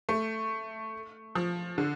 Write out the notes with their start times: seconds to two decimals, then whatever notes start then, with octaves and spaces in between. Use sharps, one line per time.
0.09 A3
1.35 F3
1.78 D3